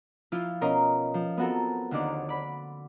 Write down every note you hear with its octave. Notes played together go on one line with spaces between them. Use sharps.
F3 E4 F4
B2 C#4 A#4 D#5 C6
F3
B3 C4 F#4 A4 A#4
D#2 D3 D#3 C5 D5 D6
D5 B5